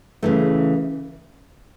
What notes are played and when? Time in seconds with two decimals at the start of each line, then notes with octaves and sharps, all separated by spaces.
0.23 C#3 E3 A3